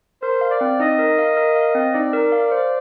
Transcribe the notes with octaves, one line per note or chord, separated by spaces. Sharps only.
A#4 C5
F5
D5
C4
D#4 D#5
A#4
F5
A#4
F5
C4
D#4 D5
A#4
F5
C5